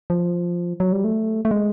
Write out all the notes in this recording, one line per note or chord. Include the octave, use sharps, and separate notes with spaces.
F3
F#3
G3
A3
A3
G#3